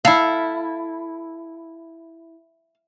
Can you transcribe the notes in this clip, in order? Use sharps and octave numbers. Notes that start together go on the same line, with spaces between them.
E4 A4 F5